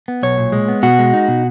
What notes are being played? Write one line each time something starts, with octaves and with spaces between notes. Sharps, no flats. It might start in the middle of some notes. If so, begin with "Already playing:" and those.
B3
B1 C#5
A#2
G#3
B3
B2 F#4
G#3
D#4
B2